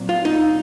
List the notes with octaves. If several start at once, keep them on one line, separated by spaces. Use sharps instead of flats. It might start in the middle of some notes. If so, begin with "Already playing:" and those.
Already playing: A#2 F#3 C4
F4
D#4